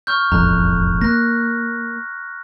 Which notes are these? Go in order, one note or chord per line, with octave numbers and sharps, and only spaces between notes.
C#6 F6 G6
E1 A1 F2 A#5 F#6
A#3 F#6 A#6